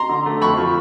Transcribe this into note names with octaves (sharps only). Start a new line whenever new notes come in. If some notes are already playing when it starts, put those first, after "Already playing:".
Already playing: A#5 C6
D3
A3
F2 B5 C#6
F3